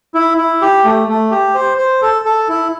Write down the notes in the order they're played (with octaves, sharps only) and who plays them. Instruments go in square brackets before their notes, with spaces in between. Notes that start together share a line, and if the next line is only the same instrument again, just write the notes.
[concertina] E4
E4
G4
A3
A3
G4
C5
C5
A4
A4
E4